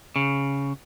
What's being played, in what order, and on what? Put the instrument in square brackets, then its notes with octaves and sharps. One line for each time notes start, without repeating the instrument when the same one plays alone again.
[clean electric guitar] C#3